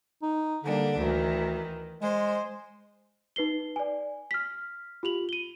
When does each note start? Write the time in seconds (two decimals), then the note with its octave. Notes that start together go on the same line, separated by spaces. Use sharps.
0.22 D#4
0.64 D3 G3 A#3 D4
0.97 D2 D#3 E3
2.02 G#3 C5
3.36 D#4 B4 C7 G7
3.76 D5 G#5
4.31 F6 B6
5.03 F4 G4 F7 F#7
5.29 D#7 G7